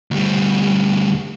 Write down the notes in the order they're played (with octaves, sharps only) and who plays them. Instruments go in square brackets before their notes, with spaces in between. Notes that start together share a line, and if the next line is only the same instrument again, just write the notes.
[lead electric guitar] D2 G3